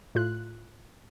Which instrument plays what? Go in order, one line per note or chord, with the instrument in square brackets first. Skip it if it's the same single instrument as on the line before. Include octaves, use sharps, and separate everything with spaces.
[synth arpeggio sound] A2 F4 F#6